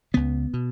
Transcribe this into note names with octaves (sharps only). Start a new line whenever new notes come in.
C#2 C#3 B3
B2